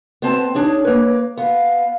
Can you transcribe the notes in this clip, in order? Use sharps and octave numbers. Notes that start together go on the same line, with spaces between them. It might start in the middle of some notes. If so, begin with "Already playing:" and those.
B3 C4 A5
D4 D#4 G#4 C#5
A#3 B4
B3 F5